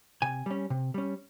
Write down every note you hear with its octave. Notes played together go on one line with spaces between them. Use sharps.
C3 G#5
G3 C#4
C3
G3 C#4